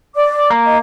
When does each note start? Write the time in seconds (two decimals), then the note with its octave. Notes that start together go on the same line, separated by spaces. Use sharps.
0.15 D5 D6
0.50 A#3
0.65 D#5